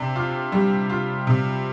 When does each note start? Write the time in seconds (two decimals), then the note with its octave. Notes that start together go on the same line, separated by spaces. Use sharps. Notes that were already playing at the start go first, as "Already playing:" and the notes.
Already playing: C3 D4
0.16 F4
0.52 G3
0.90 F4
1.27 C3